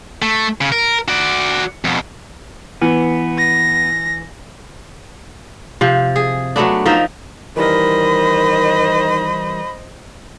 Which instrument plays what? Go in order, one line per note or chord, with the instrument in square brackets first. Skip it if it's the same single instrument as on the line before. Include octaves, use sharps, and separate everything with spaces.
[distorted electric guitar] A3
C#3
A#4
F#4 D5
F2 B2
[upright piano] E3 [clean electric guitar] B3
[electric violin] A#6
[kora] C3 F3
G#4
F#3 A3 B3 D4
F3 D#4 A#4 E5
[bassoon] D#3 [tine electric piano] E3 G3 A#4 [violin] C5 D#5 [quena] B5